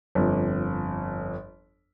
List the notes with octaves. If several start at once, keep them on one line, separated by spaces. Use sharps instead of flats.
G1 F2